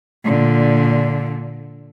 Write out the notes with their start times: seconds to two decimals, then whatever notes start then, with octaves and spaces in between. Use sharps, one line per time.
0.25 A#2 D3